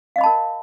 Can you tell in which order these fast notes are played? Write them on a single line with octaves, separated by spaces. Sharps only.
F5 D#5 B5 A5 A#4